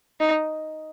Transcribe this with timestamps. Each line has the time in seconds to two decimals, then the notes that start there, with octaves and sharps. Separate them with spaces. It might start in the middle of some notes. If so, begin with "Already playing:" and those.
0.20 D#4